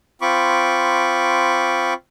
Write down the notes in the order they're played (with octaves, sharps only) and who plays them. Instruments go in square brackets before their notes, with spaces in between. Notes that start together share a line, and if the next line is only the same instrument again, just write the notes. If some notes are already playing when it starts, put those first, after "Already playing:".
[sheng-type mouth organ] C4 F4 B5 C#6 D6